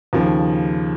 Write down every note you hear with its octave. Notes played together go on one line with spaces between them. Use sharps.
D#2 C#3 F3